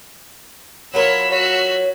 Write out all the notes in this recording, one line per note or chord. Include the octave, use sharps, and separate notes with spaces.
F#3 F4 A#4 C#5 B5 E6 B6
F#4 C#5